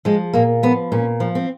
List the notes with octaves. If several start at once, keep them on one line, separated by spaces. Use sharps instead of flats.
F3 G#3
A#2 A#3
F3 B3
A#2 C#4
F3
C4